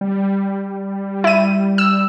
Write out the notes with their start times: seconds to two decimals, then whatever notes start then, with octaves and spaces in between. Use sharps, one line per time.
0.01 G3
1.24 E4 D#7
1.78 E6